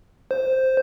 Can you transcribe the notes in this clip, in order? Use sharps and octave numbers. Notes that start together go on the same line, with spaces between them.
C5